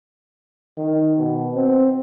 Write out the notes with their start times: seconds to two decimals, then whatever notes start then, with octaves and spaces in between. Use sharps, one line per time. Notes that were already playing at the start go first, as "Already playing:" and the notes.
0.78 D#3
1.18 B2
1.55 C4